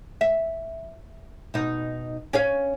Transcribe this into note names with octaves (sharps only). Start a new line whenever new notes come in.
E5
B2 D#4
C#4 C#5 F5